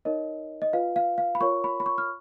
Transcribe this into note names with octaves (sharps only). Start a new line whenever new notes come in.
D#4 A#4 C#5 D#5
D#5
F4 B4 F5
F5
F5
B5
F4 A#4 C#5 C#6
B5
B5
C#6
F6